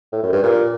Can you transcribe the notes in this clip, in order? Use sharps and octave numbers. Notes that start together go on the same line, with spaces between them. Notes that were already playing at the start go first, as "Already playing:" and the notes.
A2
F#2
G2
A#2